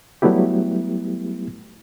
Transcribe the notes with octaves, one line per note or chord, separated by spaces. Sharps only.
F#3 G3 A3 B3 E4 G4